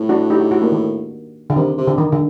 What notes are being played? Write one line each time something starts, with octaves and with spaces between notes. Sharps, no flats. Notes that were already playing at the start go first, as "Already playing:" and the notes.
Already playing: A2
D4 F#4
D#4 G4
F#4 A4
F#4 A4
A#3 D4
D#3
D3
C3 D#3
C3
D3
D#3
D3